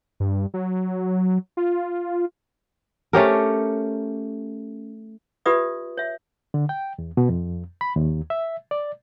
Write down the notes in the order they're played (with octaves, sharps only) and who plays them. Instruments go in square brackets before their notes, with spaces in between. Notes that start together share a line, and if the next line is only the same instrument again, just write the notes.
[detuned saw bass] G2
F#3
F4
[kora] A3 C#4 G4 A#4
[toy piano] F4 G4 B4 D5 E5 D#6
C#5 E5
[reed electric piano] D3
G5
E2
B2
F2
B5
D#2
E5
D5